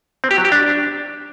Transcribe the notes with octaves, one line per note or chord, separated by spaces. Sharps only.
C4
G4
F#3
G4
D4